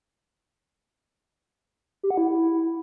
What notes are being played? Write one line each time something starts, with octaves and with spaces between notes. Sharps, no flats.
G4
F#5
E4